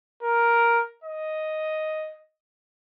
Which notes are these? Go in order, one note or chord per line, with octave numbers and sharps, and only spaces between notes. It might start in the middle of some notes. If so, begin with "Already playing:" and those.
A#4
D#5